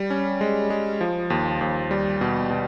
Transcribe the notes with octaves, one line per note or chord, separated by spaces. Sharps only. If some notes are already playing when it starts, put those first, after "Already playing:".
Already playing: G3
C#4
G#3
G#3
F3
D#2
D#2
G3
B2
B2